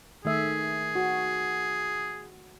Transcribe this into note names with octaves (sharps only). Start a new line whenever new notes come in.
D#3 A3 G#4 E5
F#4